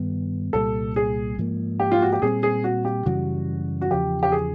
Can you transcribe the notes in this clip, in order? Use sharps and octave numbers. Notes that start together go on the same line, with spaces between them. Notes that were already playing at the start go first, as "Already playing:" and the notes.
Already playing: G2 D#3 G3 B3
C2 A#2 G3 A4
G#4
G#2 F3 A#3
G4
F4
F#4
G4
A#2 G3 C4 G#4
G#4
F#4
G4
F#2 C#3 E3 G3 F#4
F#4
E2 C#3 F3 G4
G4
G#4